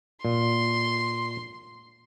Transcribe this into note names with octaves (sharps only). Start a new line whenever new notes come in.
A#2 C6